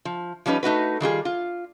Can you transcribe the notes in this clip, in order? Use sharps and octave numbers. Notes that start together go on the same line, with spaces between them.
F3
F3 G3 C#4 D#4 B4
A3 D#4 F#4 B4
D#3 G3 F4 G#4
F4